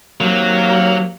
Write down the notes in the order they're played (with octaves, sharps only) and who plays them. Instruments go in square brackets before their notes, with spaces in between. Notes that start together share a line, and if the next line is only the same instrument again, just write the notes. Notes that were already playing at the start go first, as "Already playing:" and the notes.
[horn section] C3 D#3 A#3 [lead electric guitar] F#3